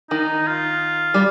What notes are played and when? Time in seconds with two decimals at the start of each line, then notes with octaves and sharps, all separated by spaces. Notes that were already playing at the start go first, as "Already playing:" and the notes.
0.10 D#3 D#4
0.47 F4
1.14 G3